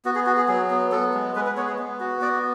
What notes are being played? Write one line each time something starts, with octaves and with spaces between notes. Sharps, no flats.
B3 F#4
G#4
F#4
G#4
F#3 G#4
B3
B3 A4
G#3
G#3 B4
B4
B3 C#5
G#4
B3
F#4
B3 D5